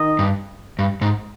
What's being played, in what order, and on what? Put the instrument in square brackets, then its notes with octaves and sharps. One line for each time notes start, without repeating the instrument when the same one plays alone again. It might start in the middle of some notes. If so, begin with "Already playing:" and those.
Already playing: [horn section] D#3 D#4 D#5
[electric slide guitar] G2
G2
G#2